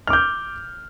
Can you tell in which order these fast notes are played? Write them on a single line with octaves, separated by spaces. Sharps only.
F6 D6 G6